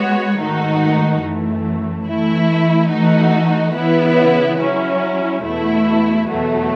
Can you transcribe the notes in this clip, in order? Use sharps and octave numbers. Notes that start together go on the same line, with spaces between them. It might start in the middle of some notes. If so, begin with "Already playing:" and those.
Already playing: G#3 B3 F#4 C#5
G#2 D#3 A3 D#4 F#4
F#2 E3 A3
E3 A3 E4
E3 A3 D#4 F#4
C#3 E3 B3 E4 B4
F#3 C#4 E4
E2 B2 A3 E4
E2 B2 F#3 A3